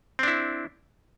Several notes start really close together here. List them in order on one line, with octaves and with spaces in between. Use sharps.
C4 D4 E4